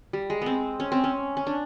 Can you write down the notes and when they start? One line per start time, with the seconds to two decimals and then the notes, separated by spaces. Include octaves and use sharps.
0.13 G3
0.30 G#3
0.42 B3 C4
0.80 C#4
0.92 C4
1.04 C#4
1.37 C#4
1.47 D4